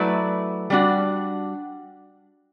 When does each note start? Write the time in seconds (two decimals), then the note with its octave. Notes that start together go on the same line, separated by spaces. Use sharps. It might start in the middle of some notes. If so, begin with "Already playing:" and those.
Already playing: F#3 A3 E4 B4 D5
0.70 G3 D4 F#4